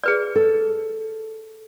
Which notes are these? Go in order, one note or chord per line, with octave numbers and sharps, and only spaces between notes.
G#4 B4 D5
A4